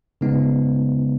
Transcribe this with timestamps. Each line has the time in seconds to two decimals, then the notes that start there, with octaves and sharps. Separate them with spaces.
0.21 C#3 G#3 B3 D#4